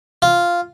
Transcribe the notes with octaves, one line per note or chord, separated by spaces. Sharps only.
F4